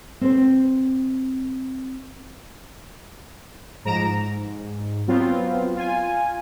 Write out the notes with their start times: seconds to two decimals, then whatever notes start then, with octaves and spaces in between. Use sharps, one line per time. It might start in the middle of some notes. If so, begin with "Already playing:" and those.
0.21 C4 C5
3.84 G#2 F3 A#5 A#6 D7 E7
4.01 G#2
5.07 F#3 B3 C4 F4
5.75 F4 G#5